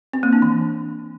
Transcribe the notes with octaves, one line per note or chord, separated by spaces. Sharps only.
C4
A#3
D4
E3